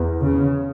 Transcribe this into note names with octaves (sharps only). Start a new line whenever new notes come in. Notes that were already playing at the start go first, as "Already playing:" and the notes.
Already playing: E2
C#3